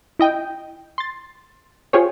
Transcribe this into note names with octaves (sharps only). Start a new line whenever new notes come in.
E4 D#5 G5
C6 A6
F4 G4 G#4 C5 C#5